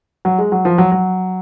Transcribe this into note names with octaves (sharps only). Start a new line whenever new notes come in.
F#3
G#3
F#3
F3
F#3
F#3